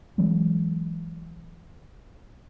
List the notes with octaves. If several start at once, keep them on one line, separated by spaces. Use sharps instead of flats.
E3 F#3 G#3 C4